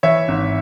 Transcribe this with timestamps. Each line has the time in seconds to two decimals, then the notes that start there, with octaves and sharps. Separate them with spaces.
0.03 E3 C#5 E5
0.28 G#1